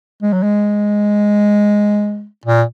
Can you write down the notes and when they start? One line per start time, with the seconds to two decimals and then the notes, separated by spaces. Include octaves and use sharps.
0.22 G#3
0.33 F#3
0.43 G#3
2.46 A#2